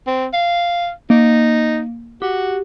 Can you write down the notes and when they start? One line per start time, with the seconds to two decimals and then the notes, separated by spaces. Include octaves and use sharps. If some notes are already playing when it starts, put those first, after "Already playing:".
0.07 C4
0.34 F5
1.10 A#3 D#4
2.22 F#4 G4